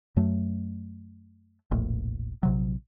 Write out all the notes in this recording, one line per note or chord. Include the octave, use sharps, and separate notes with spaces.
F#2 F#3 A3
E1 A#1 A2
A#1 C3 F#3